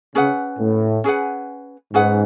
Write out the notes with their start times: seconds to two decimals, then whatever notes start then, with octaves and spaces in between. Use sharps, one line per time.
0.15 C#3 C#4 G#4 B4 F#5
0.59 A2
1.04 C#4 G#4 B4 F#5
1.93 G#2 C#4 G#4 B4 F#5